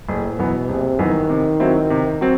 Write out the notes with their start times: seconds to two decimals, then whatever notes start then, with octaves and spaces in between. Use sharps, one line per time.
0.08 F#1 A2
0.38 F#2 B2 E3 B3
0.69 F#1 C3
0.99 F#2 D#3 E3 B3
1.30 C3
1.60 F#3 C4 E4
1.90 C3
2.21 F#3 C4